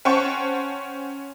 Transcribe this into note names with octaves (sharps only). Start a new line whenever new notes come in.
C#4 C5 F#5 G5 A5 C#6